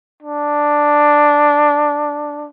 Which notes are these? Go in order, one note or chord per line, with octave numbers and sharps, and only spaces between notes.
D4